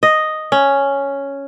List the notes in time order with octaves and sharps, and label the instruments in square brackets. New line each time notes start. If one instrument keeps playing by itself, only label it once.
[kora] D#5
C#4